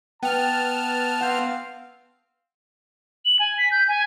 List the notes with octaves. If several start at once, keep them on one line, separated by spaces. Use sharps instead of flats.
B3 G5 A5 F6
C4 F5 F#5 G6
F#7
G#5
B6
G6
G#5